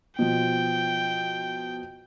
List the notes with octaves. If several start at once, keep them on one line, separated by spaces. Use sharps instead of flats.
B2 F3 G5